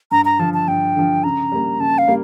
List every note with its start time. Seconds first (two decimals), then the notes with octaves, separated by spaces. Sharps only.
0.11 G2 A#5
0.25 A#5
0.39 D3 F3 A5
0.54 A5
0.68 G2 G5
0.96 D3 F3
1.24 C#3 A#5
1.52 G3 A#3
1.80 C#3 A5
1.98 F5
2.08 G3 A#3